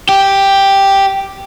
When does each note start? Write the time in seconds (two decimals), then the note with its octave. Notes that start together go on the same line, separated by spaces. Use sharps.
0.09 G4